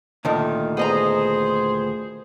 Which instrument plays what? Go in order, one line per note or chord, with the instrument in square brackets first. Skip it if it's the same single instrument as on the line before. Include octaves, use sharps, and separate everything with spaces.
[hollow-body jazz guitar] D2 A#2 D#3
[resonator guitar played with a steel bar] B3 D#5 A#5 [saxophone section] G#4 C5